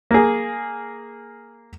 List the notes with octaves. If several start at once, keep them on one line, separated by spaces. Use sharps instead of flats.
A#3 G#4